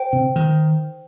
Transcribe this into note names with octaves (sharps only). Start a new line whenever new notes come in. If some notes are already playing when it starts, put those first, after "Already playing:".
Already playing: C5 G5
C3
D#3